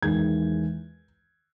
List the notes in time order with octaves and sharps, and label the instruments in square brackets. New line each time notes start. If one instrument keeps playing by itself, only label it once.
[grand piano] E2 D#3 G#3 G#6